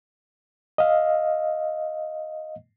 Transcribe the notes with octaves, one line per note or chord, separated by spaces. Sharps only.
D#5 F5